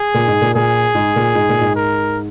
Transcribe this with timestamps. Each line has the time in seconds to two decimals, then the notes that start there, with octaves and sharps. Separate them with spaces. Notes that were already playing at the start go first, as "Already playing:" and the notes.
Already playing: G#4
0.14 A#2
0.28 G#2
0.42 A#2
0.54 A#2 G#4
0.95 G#2
1.16 A#2
1.35 G#2
1.49 A#2
1.61 G#2
1.76 A#4